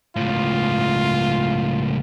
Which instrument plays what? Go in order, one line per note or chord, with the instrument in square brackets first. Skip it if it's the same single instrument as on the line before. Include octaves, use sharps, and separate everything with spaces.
[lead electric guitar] C#2 A2 [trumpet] F4